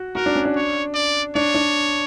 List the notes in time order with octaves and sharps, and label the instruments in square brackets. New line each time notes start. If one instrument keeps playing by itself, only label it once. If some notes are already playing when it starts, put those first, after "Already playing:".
Already playing: [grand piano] F#4
[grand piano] F#4 [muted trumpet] A#4
[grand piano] D4
C#4
D4
[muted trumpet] C#5
D5
[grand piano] D4 [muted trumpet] C#5
[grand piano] D4